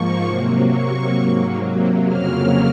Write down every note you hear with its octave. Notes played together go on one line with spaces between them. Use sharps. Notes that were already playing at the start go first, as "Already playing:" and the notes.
Already playing: G#2 F3 A#3 C#6
C3 F#3 A#3
C3 F#3 A#3 C#6
G#2 F#3 A#3
C3 F#3 A#3
F2 C#3 F#3 A#3 F6